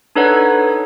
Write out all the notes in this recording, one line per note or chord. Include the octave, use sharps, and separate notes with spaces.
D4 D#4 A4 B4 C#5 F#5